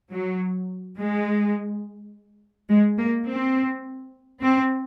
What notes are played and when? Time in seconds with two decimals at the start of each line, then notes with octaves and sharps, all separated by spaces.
0.12 F#3
0.98 G#3
2.69 G#3
2.98 A#3
3.26 C4
4.41 C4